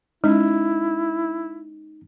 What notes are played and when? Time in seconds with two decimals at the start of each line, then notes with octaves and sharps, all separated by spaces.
0.24 G#3 C#4 D#4 E4